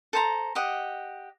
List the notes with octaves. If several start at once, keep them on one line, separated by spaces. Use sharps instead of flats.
A4 C5 A#5
G4 D#5 F#5